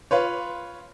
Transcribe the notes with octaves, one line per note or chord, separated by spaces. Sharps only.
F4 B4 C#5